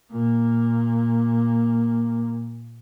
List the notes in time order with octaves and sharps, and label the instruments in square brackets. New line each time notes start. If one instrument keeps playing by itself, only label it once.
[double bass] A#2 A#3